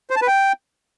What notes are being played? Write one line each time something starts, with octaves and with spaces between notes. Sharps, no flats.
C5
A5
B4
G5